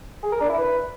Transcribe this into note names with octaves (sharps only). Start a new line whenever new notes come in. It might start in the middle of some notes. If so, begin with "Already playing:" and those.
G#4
A#4
D4
E4
B4